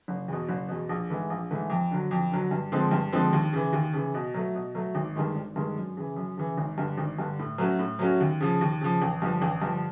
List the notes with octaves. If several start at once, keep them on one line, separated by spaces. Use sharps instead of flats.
F#1
E2 B2
F#1
E2 B2
A#1
G#2 E3 A3
A#1
G#2 E3 A3
F2
D3 F#3
F2
D3 F#3
G2
D3 F3 G#3 C4
G2
D3 F3 G#3 C4
D#2
C#3 E3
D#2
C#3 E3
B2
F#3 A3
B2
F#3 A3
G#1
G2 D#3 G#3
G#1
G2 D#3 G#3
F#2
C#3 E3
F#2
C#3 E3
G#1
G2 D3
G#1
G2 D3
A2
F#3 A3 C#4 F#4
A2
F#3 A3 C#4 F#4
D#2
C#3 F3
D#2
C#3 F3
A1
G2 D3 F3
A1
G2 D3 F3